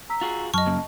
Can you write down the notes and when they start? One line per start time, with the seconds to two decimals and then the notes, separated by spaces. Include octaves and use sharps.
0.10 A#5 E6 B6
0.21 F4 F#4 G#4
0.54 F#2 F#3 D#5 A5 C#6 F6
0.67 C#3 A#3